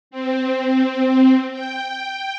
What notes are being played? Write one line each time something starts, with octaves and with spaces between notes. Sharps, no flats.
C4
G5